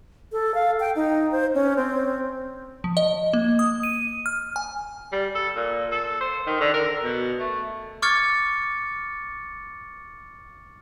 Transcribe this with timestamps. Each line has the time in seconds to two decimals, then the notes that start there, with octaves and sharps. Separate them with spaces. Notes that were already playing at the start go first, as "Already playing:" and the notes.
0.32 A4
0.55 F5
0.80 G5
0.96 D#4
1.31 C5
1.55 C#4
1.77 C4
2.84 F3
2.97 D#5
3.33 A#3
3.59 D#6
3.83 D#7
4.26 F6
4.56 G#5
5.12 G3
5.35 A4
5.56 A#2
5.92 A4
6.21 C5
6.47 D#3
6.61 D3
6.74 A#4
7.04 B2
7.39 A3
8.02 C#6 D6 F6 G#6 A6 C#7